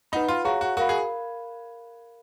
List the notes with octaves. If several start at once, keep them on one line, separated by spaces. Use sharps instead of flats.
D#4 B4 F#5 B5
F4
F#4 G#4 C#5 F5 A#5 C#6
F#4
F#4 A#4 F5 B5
G#4